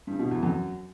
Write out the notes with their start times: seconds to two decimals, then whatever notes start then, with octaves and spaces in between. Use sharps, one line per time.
0.07 G2
0.19 B2
0.31 E2
0.43 F#2